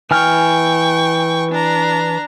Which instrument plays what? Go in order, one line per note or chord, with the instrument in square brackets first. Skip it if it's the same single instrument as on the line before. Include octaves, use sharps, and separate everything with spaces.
[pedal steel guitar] E3 G#5 F6 [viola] G5 C#6
[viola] D4 A#5